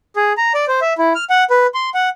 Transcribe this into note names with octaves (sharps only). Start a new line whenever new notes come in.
G#4
A#5
D5
C5
E5
E4
F6
F#5
B4
C6
F#5